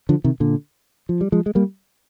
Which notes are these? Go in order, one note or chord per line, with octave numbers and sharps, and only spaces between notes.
D3 F3
C3 D#3
A#2 D3
F3
G3
F3 G#3
G#3
G3 A#3